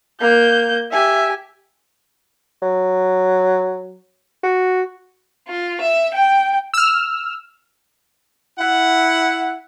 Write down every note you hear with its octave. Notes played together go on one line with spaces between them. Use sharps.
A#3 G6
G4 E5 G#5
F#3
F#4
F4
E5
G5
E6 F6
E4 F#5